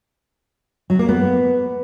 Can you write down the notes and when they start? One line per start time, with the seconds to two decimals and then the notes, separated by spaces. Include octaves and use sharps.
0.90 F#3
0.99 A#3
1.09 B3